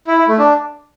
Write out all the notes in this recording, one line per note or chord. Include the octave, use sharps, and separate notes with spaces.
E4
E4
A3
D4